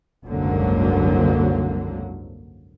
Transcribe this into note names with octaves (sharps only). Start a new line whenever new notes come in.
F#1 C2 G#2 D3 F#3 A#3